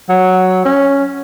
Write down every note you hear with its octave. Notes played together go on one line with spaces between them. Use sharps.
F#3
C#4